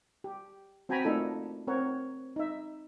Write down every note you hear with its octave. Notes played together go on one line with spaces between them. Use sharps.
G4
C4 F#4 G5 G#5 A#5 B5
A3 A#3 D4 D#4 F4 A4
C4 A#4 C#5 F#5
D#4 E5